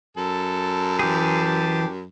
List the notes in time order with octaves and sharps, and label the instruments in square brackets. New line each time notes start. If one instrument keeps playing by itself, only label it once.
[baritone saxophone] F#2 [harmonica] A4
[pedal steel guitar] E3 G#4 [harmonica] G4 A5